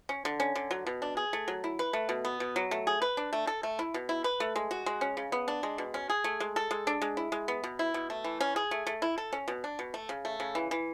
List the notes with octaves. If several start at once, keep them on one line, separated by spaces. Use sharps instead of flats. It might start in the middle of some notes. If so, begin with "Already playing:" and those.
C#4
D3
C#4
D3
F#3
B2
D4
G#4
A3
F#3
E4
B4
A3
B2
B3
B2
F#3
A3
G#4
B4
D4
A3
A4
A3
E4
B2
E4
B4
A3
G#3
F#4
G#3
C#4
C#3
B3
D4
G#3
B2
C#4
G#4
A3
G#3
A4
G#3
D4
G#3
E4
G#3
B3
B2
E4
B2
A3
E3
C#4
G#4
A3
A3
E4
A4
C#4
B2
D4
B2
A3
C#3
A3
C#3
E3
E3